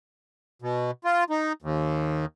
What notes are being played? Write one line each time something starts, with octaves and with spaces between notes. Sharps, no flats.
B2
F4
D#4
D#2